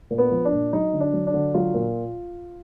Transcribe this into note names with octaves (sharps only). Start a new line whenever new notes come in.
A#2
B3
F3
D4
A#2
F#3 D#4
D3
D4
F#3
D4
D3
F#3 F4
A#2